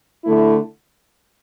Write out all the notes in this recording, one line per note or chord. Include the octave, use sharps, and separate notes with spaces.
D3 A3 E4